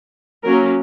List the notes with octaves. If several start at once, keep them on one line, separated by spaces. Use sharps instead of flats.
F#3 A#3 C#4 A#4